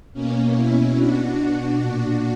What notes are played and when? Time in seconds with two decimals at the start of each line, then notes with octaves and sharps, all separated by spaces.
0.13 B2 A#3 C#4
0.54 C#4 E4
0.97 D4 F#4
1.81 A#2